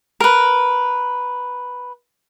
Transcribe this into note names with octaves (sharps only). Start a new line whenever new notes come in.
A#4 B4